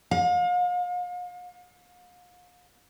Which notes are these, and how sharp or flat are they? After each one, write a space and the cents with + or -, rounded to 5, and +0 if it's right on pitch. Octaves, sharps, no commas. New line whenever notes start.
F5 +40